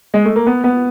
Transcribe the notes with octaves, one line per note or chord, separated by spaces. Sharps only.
G#3
A3
A#3
B3
B3